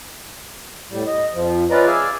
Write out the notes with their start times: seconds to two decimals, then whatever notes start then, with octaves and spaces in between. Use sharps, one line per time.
0.91 A2 G3
1.07 D#5
1.34 F2 F3
1.70 C#4 F4 B4 D5 D#5 A#5
1.87 G#4 D5 E5 F5 G#5